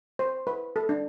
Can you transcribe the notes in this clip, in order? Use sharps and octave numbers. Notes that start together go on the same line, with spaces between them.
C5
B4
A4
D4